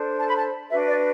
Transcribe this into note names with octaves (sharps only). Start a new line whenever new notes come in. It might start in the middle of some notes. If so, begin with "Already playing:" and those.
Already playing: D4 A4 C5
A5
B5
A5
D4 F#4 B4 E5
D5